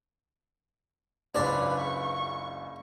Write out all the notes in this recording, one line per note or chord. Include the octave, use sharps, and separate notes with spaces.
F#1 C#2 D4 B4 C#5 D5
C#6